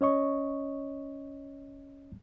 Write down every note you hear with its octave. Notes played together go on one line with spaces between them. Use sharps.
C#4 C#5 D#5 C#6